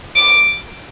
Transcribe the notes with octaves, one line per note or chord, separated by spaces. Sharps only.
D6